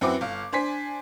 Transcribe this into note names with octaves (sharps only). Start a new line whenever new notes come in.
F#2 C4 E4 F#4 B4 D6
G1 F5
D4 C5 G#5 B6